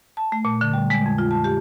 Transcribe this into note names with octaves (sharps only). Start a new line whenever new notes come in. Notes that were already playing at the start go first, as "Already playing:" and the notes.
A5
A3
A#2
D3
G3
G#3
F2
F4
A5
G4